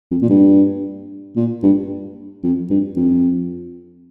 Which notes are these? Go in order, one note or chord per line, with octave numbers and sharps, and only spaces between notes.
F2
A#2
G2
A#2
G2
F2
G2
F2